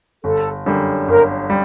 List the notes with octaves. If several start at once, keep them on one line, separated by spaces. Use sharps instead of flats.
G1 A4
F#2 D3 G3
G1 A#4
G3